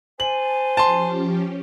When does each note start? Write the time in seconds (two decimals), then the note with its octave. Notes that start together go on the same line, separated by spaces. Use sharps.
0.20 C5 G#5 A5 F#7
0.77 F3 C#4 G4 A5 C6